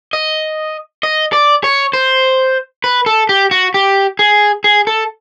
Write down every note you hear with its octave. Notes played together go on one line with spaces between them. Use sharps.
D#5
D#5
D5
C#5
C5
B4
A4
G4
F#4
G4
G#4
G#4
A4